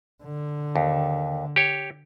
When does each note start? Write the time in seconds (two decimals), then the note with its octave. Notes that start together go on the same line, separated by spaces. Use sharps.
0.24 D3
0.76 D#2
1.56 G4 C#5